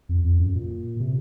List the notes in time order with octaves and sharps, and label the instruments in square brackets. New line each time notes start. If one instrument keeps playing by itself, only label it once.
[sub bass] F2
F2
F#2
A#2
C3